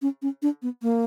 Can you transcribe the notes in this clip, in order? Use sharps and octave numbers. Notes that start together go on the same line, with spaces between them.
C#4
C#4
D4
B3
A#3